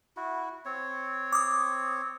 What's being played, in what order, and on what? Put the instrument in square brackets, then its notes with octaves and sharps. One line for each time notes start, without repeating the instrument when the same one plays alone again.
[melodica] E4 F#4
C4 C#5
[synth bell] D6 D#6